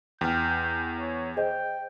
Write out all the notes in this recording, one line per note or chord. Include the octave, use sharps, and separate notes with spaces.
E2 G5 F6 G6
C#5
G#4 C5 D#5 G5